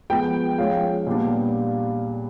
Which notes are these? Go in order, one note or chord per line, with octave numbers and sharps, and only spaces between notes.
F3 G#3 B3 G5
F3 G#3 C#4 F5
A#2 G3 B3 D4